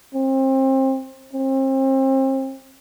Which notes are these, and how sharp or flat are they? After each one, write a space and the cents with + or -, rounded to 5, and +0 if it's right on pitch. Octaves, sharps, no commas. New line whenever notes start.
C4 +30
C4 +35